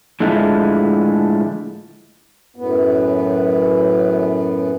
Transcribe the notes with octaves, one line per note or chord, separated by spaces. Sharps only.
A2 D3 F3 G#3 A3
F#2 A2 B3